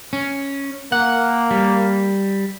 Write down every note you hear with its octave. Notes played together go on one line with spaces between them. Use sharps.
C#4
A#3 F#5
G3